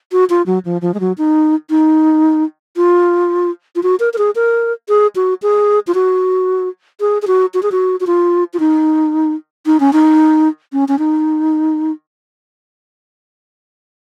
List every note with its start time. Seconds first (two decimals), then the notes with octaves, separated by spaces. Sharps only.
0.12 F#4
0.30 F4
0.46 F#3
0.65 F3
0.82 F3
0.94 G#3
1.00 F#3
1.18 D#4
1.70 D#4
2.76 F4
3.76 F4
3.83 F#4
4.00 A#4
4.13 A#4
4.18 G#4
4.36 A#4
4.89 G#4
5.16 F#4
5.42 G#4
5.87 F4
5.94 F#4
7.00 G#4
7.22 G#4
7.27 F#4
7.54 F#4
7.63 G#4
7.72 F#4
8.00 F#4
8.07 F4
8.54 F4
8.60 D#4
9.66 D#4
9.80 C#4
9.93 D#4
10.73 C#4
10.88 C#4
10.99 D#4